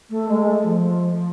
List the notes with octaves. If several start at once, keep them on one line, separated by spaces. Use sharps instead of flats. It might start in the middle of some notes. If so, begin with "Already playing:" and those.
A3
G#3
A3
F3